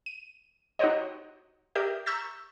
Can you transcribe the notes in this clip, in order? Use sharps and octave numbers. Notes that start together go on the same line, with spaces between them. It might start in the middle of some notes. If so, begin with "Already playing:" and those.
D#7
D#4 F#4 G4 C5 C#5 D#5
G4 A#4 D5 E5 D#6 G6
A#5 C#6 E6 G6 A6 B6